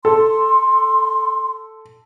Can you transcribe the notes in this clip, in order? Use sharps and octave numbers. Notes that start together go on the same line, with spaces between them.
A4 C6